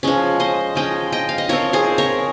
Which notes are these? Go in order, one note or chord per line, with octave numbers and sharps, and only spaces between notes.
F3 G#3 C#4
C5 D#5
F3 G#3 C#4 D#5 G5
D#5 G5
F5
D#5
F3 C4 A#4 C#5
G#4 C5
A#4 C#5